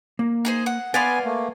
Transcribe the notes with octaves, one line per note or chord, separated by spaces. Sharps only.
A#3
D#4 G#4 C5
F#5
B3 B4 D5 F5 F#5 G#5 C6
A3 A#3